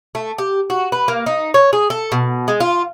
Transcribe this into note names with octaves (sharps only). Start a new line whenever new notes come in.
A3
G4
F#4
B4
A#3
D#4
C#5
G#4
A4
B2
G#3
F4